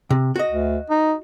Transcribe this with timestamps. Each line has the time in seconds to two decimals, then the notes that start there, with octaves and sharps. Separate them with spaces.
0.10 C3
0.36 F#4 D#5
0.50 D2
0.90 D#4